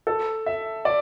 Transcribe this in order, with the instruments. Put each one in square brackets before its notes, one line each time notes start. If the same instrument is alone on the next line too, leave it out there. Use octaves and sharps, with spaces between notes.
[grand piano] A4
E5
D5